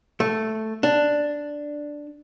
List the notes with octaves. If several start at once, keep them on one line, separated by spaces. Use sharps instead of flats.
A3
D4